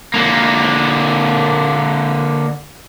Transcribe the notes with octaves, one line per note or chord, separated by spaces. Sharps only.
D3 A#3